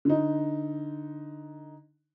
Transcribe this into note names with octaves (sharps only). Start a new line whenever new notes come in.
D3 D#4